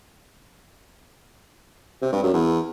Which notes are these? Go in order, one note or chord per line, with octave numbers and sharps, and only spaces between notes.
C3
G2
F#2
E2